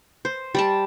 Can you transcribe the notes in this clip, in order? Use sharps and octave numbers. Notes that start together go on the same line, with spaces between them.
C5
G3 D5 A5